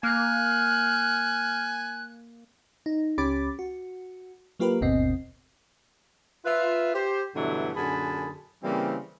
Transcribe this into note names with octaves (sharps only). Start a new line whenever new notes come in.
A#3 G#5 F6 F#6
D#4
C#2 C#4 G4 B5 D6 A6
F#4
F#3 A#3 F4 G4 A#4 B4
G1 D#2 B2 C4 D#5 C7
F4 B4 E5
G4 C5
G2 B2 D3 E3 F#3 A3
F#2 A#2 D3 G#4 A5 B5
C#3 E3 G3 A#3 C4